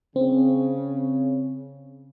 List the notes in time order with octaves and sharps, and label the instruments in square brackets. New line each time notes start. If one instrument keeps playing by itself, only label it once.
[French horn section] C#3 [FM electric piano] C4